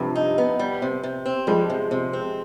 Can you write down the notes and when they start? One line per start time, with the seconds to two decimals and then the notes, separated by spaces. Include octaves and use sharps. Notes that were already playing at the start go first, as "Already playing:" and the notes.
Already playing: G2 C3 F3
0.15 D#4
0.38 B3
0.59 G3
0.82 C3
1.03 C3
1.26 C4
1.47 F3 G3 G#3
1.70 C3
1.91 C3
2.13 C4